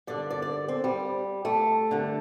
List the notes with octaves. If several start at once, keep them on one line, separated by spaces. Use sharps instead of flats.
G2 D3 D5
D5
D5
C4
G3
A3
G2 D3